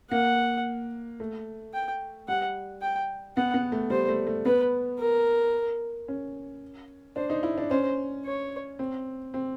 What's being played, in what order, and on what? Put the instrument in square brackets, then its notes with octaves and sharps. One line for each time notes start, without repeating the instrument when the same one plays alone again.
[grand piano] A#3 [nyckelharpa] F#5
[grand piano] A3
[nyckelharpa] G5
[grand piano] G3 [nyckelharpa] F#5
[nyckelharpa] G5
[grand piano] B3 [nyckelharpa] F#5
[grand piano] B3
A3
[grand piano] G3 [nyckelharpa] C5
[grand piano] A3
A3
[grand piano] B3 [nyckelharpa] B4
[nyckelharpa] A#4
[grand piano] C#4
[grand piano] D4 [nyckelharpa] C5
[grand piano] D#4
E4
D4
[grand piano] C#4 [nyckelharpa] C5
[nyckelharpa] C#5
[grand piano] C4
C4